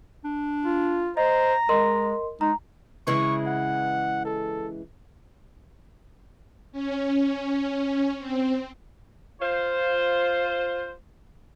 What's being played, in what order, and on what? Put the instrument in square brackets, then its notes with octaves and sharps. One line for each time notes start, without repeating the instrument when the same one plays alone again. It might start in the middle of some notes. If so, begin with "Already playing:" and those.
[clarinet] D4
[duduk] F4
[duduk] C5 [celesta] D#5 [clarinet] A#5
[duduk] G#3 [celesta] A#4 D#5 C6
[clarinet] G#3 [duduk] D#4 [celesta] A#5
[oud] C#3 E3 G#3 [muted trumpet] C#6
[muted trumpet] F#5
A4
[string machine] C#4
C4
[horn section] F4 C5